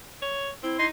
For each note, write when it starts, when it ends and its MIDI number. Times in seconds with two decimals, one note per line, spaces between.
0.22 0.50 73
0.63 0.77 60
0.63 0.88 64
0.79 0.89 63
0.79 0.86 84